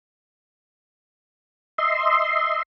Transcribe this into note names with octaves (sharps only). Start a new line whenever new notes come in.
D#5 E5 C6